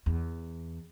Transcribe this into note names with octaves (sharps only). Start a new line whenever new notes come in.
E2